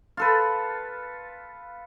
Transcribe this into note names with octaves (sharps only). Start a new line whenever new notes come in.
F4 A4 B4